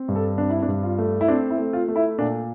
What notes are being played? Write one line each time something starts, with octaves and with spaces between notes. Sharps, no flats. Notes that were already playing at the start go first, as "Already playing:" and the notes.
Already playing: C4
G2
A4
C4 D4
E4
D4
G2
F4
A3
E4
C4 D4
E4
A3
F4
A3
E4
A#2 D4